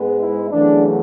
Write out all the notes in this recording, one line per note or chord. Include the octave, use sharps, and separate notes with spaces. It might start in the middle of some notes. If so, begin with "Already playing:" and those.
Already playing: G#2 G#3 B3
E4
E2 C#3 F#3 A3 D4